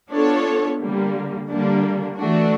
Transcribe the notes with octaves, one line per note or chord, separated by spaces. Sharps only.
B3 D4 F4 A4 C#5
D3 G3 A#3
D3 G3 A#3 D4
E3 A3 D4 F#4